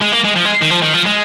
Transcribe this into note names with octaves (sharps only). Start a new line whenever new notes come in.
G#3
A#3
G#3
F3
G#3
D#3
F3
D#3
F3
G#3